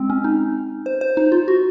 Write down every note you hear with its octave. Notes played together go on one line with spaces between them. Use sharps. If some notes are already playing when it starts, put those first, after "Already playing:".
Already playing: G#3 C4
C#4
D#4
C5
C5
D#4
F4
F#4